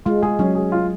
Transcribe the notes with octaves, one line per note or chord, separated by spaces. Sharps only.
G#3 F4
G#3 G#4
F#3 C#4
G#4
F4